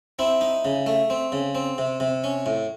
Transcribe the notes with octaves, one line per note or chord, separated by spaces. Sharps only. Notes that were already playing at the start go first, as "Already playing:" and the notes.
C4 E4
D#4
C#3
A3
C4
C#3
C4
C3
C3
C#4
A2